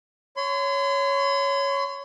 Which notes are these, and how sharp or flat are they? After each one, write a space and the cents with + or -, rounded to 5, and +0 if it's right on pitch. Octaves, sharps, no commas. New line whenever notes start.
C#5 +5 C6 -40